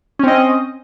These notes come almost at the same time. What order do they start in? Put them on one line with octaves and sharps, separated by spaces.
C#4 C4 D#5